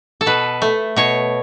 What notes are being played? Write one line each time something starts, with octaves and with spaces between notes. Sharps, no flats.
A4
B2 B4
A3
B2 C#5